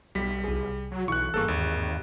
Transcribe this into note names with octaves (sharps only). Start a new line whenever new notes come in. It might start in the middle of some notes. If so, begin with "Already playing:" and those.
B1 G3 B6
C2 G#4
F#3
B1 E3 C#6 F#6
G#1 G2 A#3 G#4 A4 C#6
G#1 D#2